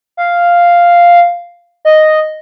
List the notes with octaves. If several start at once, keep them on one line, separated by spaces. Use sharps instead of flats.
F5
D#5